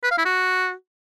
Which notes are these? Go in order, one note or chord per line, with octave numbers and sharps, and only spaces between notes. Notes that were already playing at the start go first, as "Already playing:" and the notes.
B4
F5
E4
F#4